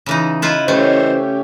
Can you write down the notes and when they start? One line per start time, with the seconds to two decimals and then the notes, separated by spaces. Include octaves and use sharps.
0.06 C#3 E3 D#4
0.42 E4 F4 B4 D#5
0.68 E3 A3 C#4 G4 C5 C#5